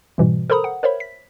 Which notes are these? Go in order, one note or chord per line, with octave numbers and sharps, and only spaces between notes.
G#2 B2 E3 G3
A4 A#4 C5 A#5 B5 D#6
F#5
A#4 C5 C#5 E5 B5
B6